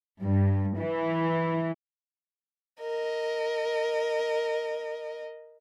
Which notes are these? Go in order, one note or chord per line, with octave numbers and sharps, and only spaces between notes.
G2
E3
A#4 D#5